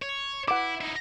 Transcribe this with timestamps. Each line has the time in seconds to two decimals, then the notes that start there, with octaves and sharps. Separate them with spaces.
0.02 C#5
0.48 E4 F#5 D6
0.81 D#4 E4